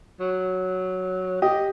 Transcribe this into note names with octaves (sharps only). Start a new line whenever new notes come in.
F#3
G4 D#5